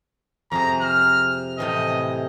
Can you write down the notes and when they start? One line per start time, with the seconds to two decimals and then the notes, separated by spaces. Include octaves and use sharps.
0.52 F2 C3 G#4 A#5
0.81 C5 F6
1.58 A2 C3 E3 D#5